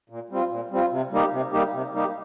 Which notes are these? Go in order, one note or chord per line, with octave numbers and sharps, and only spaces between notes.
A#2
G3 C4 F4
A#2
G3 C4 F4
C3
G3 A#3 D#4 G4
C3
G3 A#3 D#4 G4
C3
G3 A#3 D#4 G4